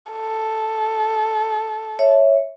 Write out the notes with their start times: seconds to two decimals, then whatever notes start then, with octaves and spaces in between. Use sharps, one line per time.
0.12 A4
1.99 C#5 E5